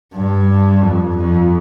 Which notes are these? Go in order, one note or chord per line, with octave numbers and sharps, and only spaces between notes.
G2
F2
F2